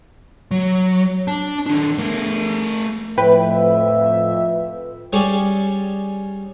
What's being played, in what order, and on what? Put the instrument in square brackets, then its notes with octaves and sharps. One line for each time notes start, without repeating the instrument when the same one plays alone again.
[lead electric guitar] F#3
D4 A5
D#3 D4
A3 A#4
[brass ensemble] F2 E5 [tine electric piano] A2 [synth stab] B4 G5
[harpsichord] G3 C#4 G#4 D5